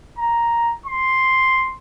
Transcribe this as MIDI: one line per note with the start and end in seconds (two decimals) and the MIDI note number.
0.19 0.74 82
0.86 1.74 84